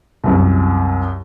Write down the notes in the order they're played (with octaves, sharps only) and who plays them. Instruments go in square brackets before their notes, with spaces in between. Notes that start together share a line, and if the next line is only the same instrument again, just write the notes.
[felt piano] C2 F#2